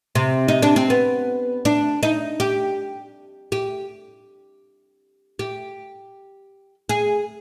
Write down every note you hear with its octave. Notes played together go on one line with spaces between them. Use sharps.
C3
D#4
D4
C4
B3
D4
D#4
G4
G4
G4
G#4